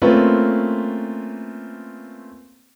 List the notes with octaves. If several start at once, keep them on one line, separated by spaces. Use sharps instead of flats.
A3 A#3 C4 C#4 F4 B4